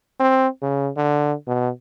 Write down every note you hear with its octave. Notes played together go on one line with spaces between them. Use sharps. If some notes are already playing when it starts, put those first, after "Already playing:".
C4
C#3
D3
B2